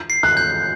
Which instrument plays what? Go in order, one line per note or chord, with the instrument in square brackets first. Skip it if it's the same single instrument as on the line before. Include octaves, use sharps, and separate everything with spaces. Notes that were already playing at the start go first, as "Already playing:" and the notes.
Already playing: [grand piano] G6
[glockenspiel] C7
[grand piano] F#6
[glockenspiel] G6